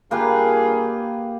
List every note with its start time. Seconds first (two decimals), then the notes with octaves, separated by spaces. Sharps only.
0.11 G2 A#3 F4 G4 G#4 B4